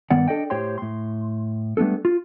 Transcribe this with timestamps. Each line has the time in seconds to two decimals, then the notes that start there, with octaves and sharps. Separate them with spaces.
0.10 G2 D#3 B3 D5 F#5
0.28 D4 A4 D5 D#5 G5
0.50 A2 G4 C5 C#5 G5 C6
0.78 A2 C6
1.77 G3 A3 B3 D4 A4
2.05 F4